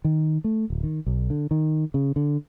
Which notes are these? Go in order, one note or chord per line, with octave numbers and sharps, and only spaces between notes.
D#3
A3
D1
D#3
B1
D3
D#3
C#3
D3